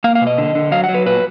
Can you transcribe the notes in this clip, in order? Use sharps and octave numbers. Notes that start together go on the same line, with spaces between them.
A#3 F5
F5
B2
D#5
D3
D3
F#3 F5
F#5
F#3
B4
A#2 B4